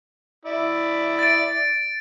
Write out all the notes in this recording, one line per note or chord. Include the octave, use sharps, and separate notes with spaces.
E4 D5 E5
A6 D7